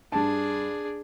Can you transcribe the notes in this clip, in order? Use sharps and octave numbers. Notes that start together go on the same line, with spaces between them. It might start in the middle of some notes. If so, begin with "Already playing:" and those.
G2 D4 G#4 A5